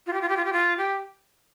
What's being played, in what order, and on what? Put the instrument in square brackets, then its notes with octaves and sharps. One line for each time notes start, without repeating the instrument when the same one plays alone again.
[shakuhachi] F4
G4
F4
G4
F4
G4
F4
G4